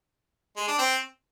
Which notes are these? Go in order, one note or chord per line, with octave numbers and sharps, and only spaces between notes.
G#3
D4
C4